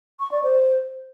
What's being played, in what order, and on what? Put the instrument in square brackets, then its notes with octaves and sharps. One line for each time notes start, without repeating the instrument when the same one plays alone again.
[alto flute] C#6
D5
C5